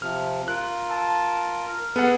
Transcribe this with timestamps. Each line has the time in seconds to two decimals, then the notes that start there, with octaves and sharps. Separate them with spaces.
0.02 C3 F3 F6
0.48 F4 A#4 F#6
0.90 A5
1.66 A#4
1.96 B3 G#4 A4 F#5